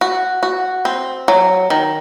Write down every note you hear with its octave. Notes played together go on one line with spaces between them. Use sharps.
F#4
F#4
C4
F#3
D#3